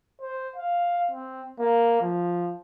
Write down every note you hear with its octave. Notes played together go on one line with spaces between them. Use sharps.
C5
F5
C4
A#3
F3